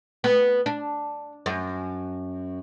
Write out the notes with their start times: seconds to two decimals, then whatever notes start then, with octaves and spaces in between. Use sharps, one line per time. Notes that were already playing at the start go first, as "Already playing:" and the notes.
0.24 B3
0.66 D4
1.46 F#2